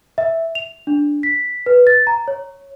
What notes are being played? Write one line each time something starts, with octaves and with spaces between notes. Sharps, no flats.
E5
F7
D4
B6
B4
A6
A#5
C#5